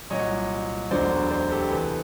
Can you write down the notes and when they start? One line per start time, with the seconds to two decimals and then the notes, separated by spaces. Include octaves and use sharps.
0.10 C2 A#2 F#3 C#5 D#5
0.91 E1 D2 D3 F#3 C5 D5
1.31 C5 D5
1.51 G4 A4
1.71 E2 C3 E3 A4 B4